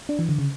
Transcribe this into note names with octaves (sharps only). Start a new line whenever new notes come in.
D4
E3
D3
C#3